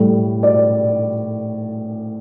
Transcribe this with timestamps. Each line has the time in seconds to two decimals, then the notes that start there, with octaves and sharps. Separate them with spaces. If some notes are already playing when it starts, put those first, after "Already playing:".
Already playing: A2 G3
0.43 D5